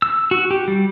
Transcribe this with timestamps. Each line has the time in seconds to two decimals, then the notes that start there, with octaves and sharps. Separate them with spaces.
0.02 E6
0.31 F#4
0.51 G4
0.68 G3